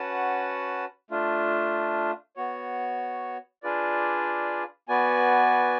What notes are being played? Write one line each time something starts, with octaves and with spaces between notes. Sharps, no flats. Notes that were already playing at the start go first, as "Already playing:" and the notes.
Already playing: C#4 F#4 B4 F#5 A5
A3 D4 F4
B3 F#4 C#5
D4 F4 G#4 B4 D5
B3 F#4 B4 D5 G#5